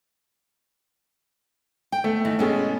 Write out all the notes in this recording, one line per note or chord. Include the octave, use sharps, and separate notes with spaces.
G5
A3 B3
D#3 E3 E4
B2 G#3 B3 C#4 A4